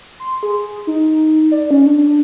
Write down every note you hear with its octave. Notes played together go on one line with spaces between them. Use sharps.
C6
G#4
D#4
D5
C#4
D4